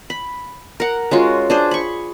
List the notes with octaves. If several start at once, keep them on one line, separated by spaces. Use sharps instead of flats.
B5
A#4 F#5
G#3 C#4 F4 F#4
D4 G#4 C5
B5 C#6